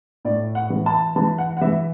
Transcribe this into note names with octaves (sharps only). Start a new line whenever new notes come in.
A2 D5
F#5
E3
A5
E3 A5
F#5
F#5
E3 E5